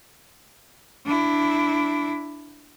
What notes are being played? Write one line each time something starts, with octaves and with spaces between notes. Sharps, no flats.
D4 E4